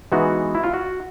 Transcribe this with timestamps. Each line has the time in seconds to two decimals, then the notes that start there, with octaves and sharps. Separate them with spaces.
0.12 E3 G#3 B3 D#4 F#4
0.55 E4
0.64 F4
0.74 F#4